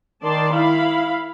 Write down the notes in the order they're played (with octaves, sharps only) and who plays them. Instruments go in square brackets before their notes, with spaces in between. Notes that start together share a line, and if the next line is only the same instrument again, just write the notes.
[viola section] D#3 D5 A5 C6
E4 F5 B5